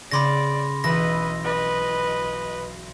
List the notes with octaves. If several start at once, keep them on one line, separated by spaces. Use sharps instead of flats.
C#3 C#4 D5 B5 C6 D6 A#6
B1 E3 B4 D#5 E6 A#6
B4 D#5